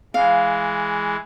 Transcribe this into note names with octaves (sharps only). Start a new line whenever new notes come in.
E3 G#3 F5